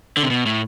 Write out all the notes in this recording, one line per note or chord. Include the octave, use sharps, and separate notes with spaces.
D3
C3
B2
A2